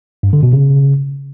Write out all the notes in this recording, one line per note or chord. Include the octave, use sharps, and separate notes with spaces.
G2
D3
B2
C#3